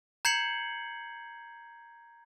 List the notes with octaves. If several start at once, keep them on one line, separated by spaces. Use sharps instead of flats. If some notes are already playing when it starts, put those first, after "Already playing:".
A#5 G6 G#6 C7 C#7 F#7